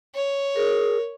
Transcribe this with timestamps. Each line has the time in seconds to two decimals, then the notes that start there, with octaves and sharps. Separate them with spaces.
0.15 C#5
0.56 G#4 A#4